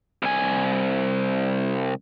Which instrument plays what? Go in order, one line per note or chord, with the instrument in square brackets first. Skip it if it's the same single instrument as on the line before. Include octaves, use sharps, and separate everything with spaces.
[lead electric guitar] C2 G#5